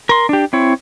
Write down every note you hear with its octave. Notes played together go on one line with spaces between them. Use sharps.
A#4 C6
D4 G4
C4 E4 C#5